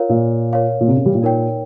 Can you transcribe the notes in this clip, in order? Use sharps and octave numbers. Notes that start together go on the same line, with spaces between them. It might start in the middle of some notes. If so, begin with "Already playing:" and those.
Already playing: F4 A#4 C#5 F5
A#2
A#4 C#5 F5
A#2
C3
C#3
G3
A#2
D#4 A#4 C#5 G5